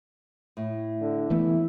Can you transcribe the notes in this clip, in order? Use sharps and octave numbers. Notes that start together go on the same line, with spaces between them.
A2
D3
E3 A3 B3 E4